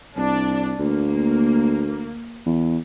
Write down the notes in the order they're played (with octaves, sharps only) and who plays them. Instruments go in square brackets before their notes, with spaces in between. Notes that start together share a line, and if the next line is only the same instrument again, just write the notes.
[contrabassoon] C2 [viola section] D4
[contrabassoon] D2 [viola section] A#3
[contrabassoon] E2